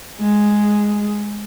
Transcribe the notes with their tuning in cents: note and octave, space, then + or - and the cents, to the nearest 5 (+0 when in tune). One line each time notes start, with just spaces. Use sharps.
G#3 +0 G#4 +0